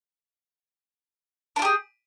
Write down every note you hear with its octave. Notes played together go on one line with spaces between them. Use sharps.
D4 F4 G4 G#4